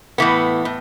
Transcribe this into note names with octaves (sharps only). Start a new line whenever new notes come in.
A2 E3 B3
A2